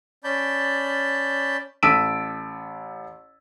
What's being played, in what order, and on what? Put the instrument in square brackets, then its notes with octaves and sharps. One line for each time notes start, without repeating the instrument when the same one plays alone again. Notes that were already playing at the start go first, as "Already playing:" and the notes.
[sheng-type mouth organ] C#4 D5 A5 B5 G6
[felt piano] A1 A5 E6 B6 D7 D#7